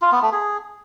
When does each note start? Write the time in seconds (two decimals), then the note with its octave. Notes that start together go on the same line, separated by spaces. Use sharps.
0.02 F4
0.12 B3
0.22 A3
0.32 G#4